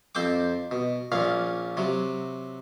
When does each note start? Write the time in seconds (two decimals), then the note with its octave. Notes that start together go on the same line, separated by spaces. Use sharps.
0.15 F2 C4 C5 G5 D6
0.71 B2
1.12 A#1 A#2 C#4 F5
1.77 C3 F#3